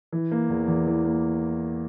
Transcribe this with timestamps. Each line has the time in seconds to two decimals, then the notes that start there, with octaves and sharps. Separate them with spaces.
0.13 E3
0.32 A#3
0.50 E2
0.68 E2
0.87 E3
1.05 A#3